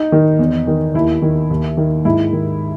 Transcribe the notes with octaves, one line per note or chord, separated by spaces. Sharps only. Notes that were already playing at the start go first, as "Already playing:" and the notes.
Already playing: D#4
D#3
E2
D#3
D#2 E4
D#3
D#2
D#3
G#2 E4
D#3